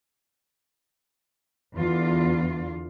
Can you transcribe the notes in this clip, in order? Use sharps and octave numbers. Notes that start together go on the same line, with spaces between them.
E2 D3 F4 D5